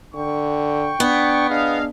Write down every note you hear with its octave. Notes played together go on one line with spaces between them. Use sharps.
D3 G5 C#6
B3 D4
D4 G#4 D#5 F5